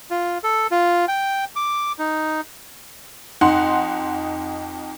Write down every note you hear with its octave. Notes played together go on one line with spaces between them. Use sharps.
F4
A4
F4
G5
D6
D#4
F2 D#4 F#5 C6